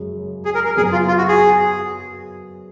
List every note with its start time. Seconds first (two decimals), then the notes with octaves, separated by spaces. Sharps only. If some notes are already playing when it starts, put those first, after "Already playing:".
Already playing: F#2 C#3 G#3
0.45 G#4
0.55 A#4
0.65 A#4
0.76 F#2 C#3 F#3 B3 G#4
0.92 F4
1.08 F4
1.18 F#4
1.28 G#4